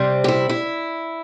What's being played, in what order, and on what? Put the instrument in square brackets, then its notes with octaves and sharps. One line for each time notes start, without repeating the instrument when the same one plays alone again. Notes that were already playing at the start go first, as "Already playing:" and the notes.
Already playing: [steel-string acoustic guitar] C3 G3 C4
G4
E4
E4